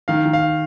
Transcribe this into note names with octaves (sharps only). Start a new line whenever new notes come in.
D#3 F5
D#3
F5